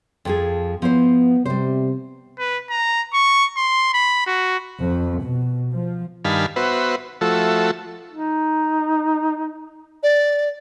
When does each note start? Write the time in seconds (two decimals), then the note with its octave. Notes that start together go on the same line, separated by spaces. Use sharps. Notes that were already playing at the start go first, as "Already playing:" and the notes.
0.25 F2 F3 G#4
0.82 F3 B3 E4 C5
1.45 C3 G3 C5
2.38 B4
2.70 A#5
3.13 C#6
3.57 C6
3.93 B5
4.26 F#4
4.80 F2
5.22 B2
5.72 F3
6.25 G2 D#3 F5 G#5 A5 B5
6.56 B3 F#4 B4 C5 E5
7.21 F3 A3 F#4 A4 E5
8.11 D#4
10.03 D5